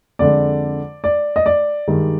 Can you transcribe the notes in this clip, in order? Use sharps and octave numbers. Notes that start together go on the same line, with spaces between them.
F2 D3 G#3 D5
D5
D#5
D5
G2 D#3 G#3